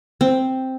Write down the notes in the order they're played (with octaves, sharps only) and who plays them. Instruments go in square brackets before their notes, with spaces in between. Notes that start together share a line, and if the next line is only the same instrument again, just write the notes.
[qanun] C4